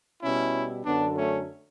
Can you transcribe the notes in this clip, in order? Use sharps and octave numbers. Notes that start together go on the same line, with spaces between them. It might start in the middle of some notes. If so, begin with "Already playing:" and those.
B2 G3 C#4 E4
F#2 D3 F#3 B3 D4
A3 C#4